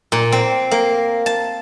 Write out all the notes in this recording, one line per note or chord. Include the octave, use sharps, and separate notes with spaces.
A#2
C4
A#3
A5